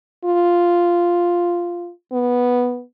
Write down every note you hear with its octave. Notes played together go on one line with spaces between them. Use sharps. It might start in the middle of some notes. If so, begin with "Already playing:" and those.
F4
B3